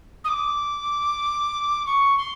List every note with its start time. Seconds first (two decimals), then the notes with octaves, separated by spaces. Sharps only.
0.24 D#6
0.28 D6
1.85 C#6
2.17 C6